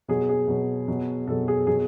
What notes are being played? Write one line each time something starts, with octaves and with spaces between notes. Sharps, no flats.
B2 F#3 G#4
G#4
B2 F#3
B2 F#3
B2 F#3 A4
G#4
B2 F#3 G#4